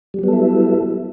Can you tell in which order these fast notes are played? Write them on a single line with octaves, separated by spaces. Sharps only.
G3 F#3 B3 A4 E4